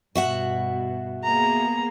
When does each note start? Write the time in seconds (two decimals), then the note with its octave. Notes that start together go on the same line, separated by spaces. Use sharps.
0.15 G2 B2 F#4 E5 F#5
1.24 A#3 B3 G#4 A#5